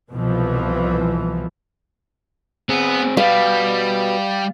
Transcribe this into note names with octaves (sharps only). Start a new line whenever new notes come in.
C2 B2 E3 F3
B3 C4 G#4
G3 F#4 B4 F5